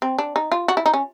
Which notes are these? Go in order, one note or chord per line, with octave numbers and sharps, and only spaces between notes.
C4
D4
D#4
F4
F#4
E4
D#4
C#4